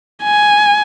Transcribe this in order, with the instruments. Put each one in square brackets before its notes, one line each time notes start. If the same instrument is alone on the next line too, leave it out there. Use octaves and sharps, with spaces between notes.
[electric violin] G#5